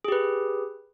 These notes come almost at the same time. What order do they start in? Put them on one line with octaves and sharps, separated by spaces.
G#4 G4 B4